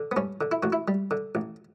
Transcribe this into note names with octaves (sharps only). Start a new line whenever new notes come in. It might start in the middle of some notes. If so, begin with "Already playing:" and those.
Already playing: D3
B3
G2 C#4
D3
E4
A1 F#4
E4
G3
D3
A1